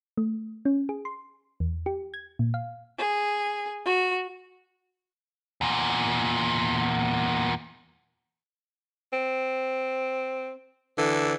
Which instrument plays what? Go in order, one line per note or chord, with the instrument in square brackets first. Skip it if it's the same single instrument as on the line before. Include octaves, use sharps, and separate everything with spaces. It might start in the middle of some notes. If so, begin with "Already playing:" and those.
[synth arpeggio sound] A3
C#4
G#4
C6
E2
G4
G#6
A#2
F5
[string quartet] G#4
F#4
[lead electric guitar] E2 A#2
[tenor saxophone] C4
[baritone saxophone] D3 [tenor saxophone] E3